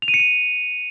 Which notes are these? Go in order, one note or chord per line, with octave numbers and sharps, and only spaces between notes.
F7
D#7
C#7
D#7